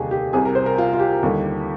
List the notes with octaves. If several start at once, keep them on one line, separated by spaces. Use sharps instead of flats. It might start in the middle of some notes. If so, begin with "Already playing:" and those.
Already playing: F1 D#2 D3 G3 G4 G#4
G4
C2 C3 G3 G#4
A#4
C5
A#4
F4
F4
G4
D#2 D3 G3